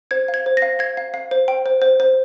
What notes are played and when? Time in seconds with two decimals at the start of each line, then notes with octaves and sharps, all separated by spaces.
0.11 C5 G#6
0.28 F5
0.34 G#6
0.46 C5
0.57 A#6
0.62 F5
0.79 F5 G#6
0.97 F5
1.14 F5
1.31 C5
1.48 G5
1.66 C5
1.82 C5
2.00 C5